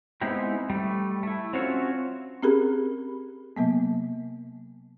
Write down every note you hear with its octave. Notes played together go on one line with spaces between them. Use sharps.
G#3 B3 C4 D#4 E4 G4
G3 A3
A3 E4
C4 C#4 F4 F#4 C#5
C4 C#4 G4 G#4 A#4 B5
C3 F#3 A#3 B3